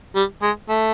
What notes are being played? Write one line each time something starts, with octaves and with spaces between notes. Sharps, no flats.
G3
G#3
A3